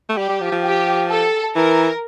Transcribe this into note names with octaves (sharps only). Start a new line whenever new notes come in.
A3
G3 G4
G3
F3
F3
G4
A4
E3 A#4